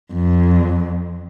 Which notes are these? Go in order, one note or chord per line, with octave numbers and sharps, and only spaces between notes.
F2